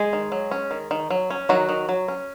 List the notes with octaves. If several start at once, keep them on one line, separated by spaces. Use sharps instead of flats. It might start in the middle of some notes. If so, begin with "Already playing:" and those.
Already playing: G#3 G#4
D#3
F#3
C#4
D#3
D#3
F#3
C#4
D#3 F#3 F#4
D#3
F#3
C#4